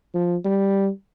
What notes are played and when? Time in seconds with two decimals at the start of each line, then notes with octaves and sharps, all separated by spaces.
0.14 F3
0.45 G3